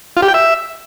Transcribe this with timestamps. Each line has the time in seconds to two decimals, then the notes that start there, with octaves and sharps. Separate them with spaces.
0.17 F4
0.22 G4
0.28 G5
0.34 E5